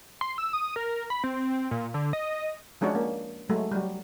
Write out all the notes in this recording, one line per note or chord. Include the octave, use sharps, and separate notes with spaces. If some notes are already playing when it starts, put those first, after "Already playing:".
C6
E6
D#6
A#4
B5
C4
A#2
D3
D#5
F3 G#3 C#4 D4 F#4
A#3
F#3 G#3 A3
F#3 G3